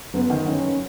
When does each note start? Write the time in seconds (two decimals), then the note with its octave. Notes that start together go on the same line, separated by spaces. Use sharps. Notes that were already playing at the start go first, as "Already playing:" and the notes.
0.14 F#1 B3
0.30 D#3
0.47 F#1 C#4